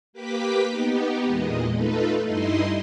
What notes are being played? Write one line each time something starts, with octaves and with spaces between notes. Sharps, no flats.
A#3 G4 B4 D6 B6
B3 D#4 G4
E2 A#2 G#3 D#5
A3 D#4 F4 A4 B4
G2 D#4 E4 D#5 C6